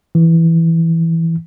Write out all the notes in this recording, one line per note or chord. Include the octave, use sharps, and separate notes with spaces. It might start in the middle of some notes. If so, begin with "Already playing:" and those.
E3